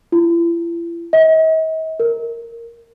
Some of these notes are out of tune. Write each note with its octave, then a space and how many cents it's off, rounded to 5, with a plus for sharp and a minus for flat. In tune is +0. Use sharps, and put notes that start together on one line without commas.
E4 +45
D#5 +45
A#4 -10